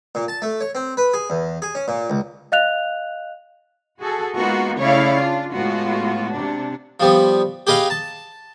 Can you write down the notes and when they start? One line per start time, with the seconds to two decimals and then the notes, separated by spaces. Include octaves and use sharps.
0.15 A#2
0.28 A5
0.42 A3
0.61 C#5
0.75 C4
0.97 B4
1.14 G#4
1.30 E2
1.62 G#4
1.75 C#4
1.88 A#2
2.10 C#2
2.52 D#5 F5 F#6 F7
3.99 F#4 G#4 A4
4.36 G#3 A#3 B3 D#4 F4 F#4
4.77 C#3 A3 E4 C#5 D5 F5
5.18 D4 F4
5.51 A2 G#3 B3 F4 F#4
6.32 C3 D4
7.00 F3 G3 B3
7.67 G4 G#4 B4 D#5 F5
7.90 A5